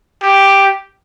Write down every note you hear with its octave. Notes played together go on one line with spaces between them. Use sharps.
G4